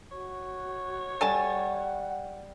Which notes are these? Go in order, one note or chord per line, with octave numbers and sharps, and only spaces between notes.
F#4 C#5
G3 A4 F#5 G#5 A5